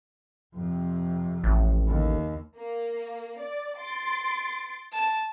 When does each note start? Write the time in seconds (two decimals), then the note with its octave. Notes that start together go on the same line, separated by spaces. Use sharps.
0.54 F2 C3
1.44 A1
1.87 D#2
2.56 A#3
3.41 D5
3.78 C6 A6 D7
4.92 A5